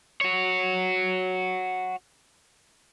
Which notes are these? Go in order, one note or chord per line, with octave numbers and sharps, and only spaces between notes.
F#4 C#5